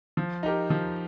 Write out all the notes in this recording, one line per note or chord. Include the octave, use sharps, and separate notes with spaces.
F3
D#4 G4 A#4
F3